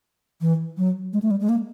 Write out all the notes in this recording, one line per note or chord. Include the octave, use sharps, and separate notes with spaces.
E3
F#3
G#3
A3
G3
G#3
A#3